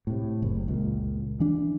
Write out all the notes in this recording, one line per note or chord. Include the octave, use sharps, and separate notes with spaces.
A2 C3
F#1
C#2 A#2
E3 D4